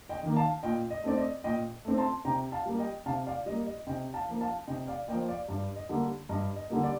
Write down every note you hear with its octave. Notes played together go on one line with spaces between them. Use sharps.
D#5 G5
D#3 A#3
F5 A5
A#2 D#5 G5
D#5
A3 C4 D5
D#5
A#2 D#5 G5
A3 C4
A5 C6
C3 G5 A#5
F5 A5
G3 A#3
D#5 G5
C3 F5 A5
D5 F5
G3 A#3 D#5
D#5
C3 D#5 G5
F5 A5
F3 A#3
F5 A5
C3 D#5 G5
D5 F5
F3 A#3 D#5 G5
D5 F5
G2 D5
D#5
D3 G3 A#3
G2 D#5
D#5
D3 G3 A#3
D5